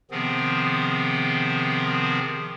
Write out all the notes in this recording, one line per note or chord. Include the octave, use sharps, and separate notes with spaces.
C3 D#3 F3 B3 C4 G#4